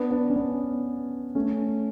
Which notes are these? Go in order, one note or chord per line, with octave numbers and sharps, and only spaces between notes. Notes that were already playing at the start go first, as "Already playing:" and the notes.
Already playing: B3 D4
B3 D4
C#4
B3 D4
A3 C#4